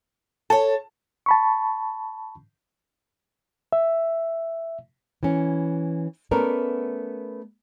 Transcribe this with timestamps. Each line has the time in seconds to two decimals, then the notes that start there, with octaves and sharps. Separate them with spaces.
0.50 A4 C#5 A5
1.26 A5 B5 C#6
3.73 E5
5.23 E3 C#4
6.31 A3 B3 C#4 A#4 B4 D5